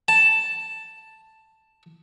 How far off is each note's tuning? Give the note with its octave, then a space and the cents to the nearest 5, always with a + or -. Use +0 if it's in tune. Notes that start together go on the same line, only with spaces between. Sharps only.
A5 +5